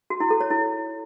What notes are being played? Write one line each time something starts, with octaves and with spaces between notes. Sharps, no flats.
F#4
E4
A4
C#5
E4